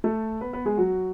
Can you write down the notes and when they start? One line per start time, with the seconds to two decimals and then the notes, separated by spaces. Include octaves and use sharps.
0.04 A3 A4
0.41 B3 B4
0.53 B3 B4
0.65 G#3 G#4
0.77 F#3 F#4